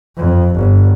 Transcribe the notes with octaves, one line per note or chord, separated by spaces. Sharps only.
F2
G1